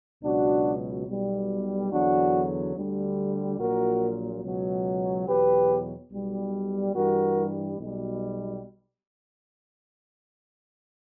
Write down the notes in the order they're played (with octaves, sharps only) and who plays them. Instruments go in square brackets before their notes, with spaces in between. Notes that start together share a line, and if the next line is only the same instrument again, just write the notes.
[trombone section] C#2 B2 F#3 D4 F#4
B1 B2 G3
E2 D3 F#3 D4 F#4
D2 D3 G3
A#1 A#2 F#3 F#4 A#4
C#2 B2 F#3
E2 B2 F#3 G4 B4
B1 B2 G3
G2 E3 G3 F#4 A#4
B1 B2 G3